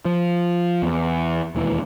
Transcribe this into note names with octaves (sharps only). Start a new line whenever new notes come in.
F3
E2
E1 D#2 E3